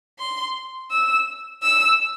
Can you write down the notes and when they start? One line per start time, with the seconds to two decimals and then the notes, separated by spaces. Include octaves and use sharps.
0.19 C6
0.90 E6
1.62 E6